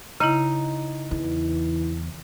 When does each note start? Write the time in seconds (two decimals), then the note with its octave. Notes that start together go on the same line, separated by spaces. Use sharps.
0.20 C#3 D#4 E4
1.11 E2 E3